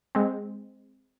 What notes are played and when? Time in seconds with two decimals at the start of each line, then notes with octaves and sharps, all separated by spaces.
0.15 G#3 C4